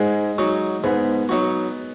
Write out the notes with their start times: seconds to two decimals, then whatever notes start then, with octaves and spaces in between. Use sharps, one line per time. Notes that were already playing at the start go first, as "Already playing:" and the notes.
Already playing: G#2 G#3
0.38 F#3 D#4 F#4
0.84 G#2 B3
1.29 F#3 D#4 F#4